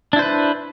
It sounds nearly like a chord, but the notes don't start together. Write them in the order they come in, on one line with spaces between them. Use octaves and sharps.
D4 E4 C5 B4